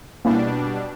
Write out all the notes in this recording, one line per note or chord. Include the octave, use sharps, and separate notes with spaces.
B2 G3 A#3 C#4 D4 E4